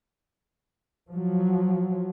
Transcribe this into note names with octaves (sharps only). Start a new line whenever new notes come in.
F3 F#3